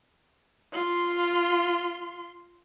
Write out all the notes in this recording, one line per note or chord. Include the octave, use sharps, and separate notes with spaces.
F4 C6